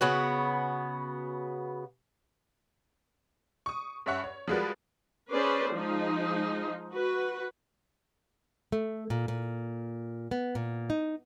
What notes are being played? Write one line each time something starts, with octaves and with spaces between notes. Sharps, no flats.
C#3 B3 F#4
C#6 D#6
G2 C#4 E5 F#5 C#6
C#5
F3 G3 G#3 F#4 A#4 B4
C#4 G#4 B4 C5 D5
F3 G#3 D#4
F#4 B4
A3
A#2
A#2
B3
A#2
D#4